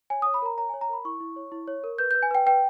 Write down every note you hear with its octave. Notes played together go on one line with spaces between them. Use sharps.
C#5 G#5
C#5 D#6
B5
A#4 A#5
C#5 A#5
C#5 G#5
A#5
A#4 B5
E4 C#6
E4
C#5
E4
C#5
A#4
B4 G6
B4 G6
G#5
B4 G5
B4 G5